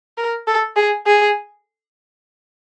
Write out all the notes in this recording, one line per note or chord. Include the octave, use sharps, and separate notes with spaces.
A#4
A4
G#4
G#4